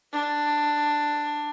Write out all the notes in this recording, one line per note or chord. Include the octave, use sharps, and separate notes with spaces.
D4